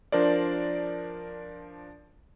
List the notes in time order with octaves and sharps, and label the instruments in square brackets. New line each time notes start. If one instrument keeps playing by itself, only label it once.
[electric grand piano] F3 D4 A#4 C5 D5